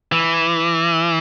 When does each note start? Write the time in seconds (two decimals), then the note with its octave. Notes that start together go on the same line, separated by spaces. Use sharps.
0.12 E3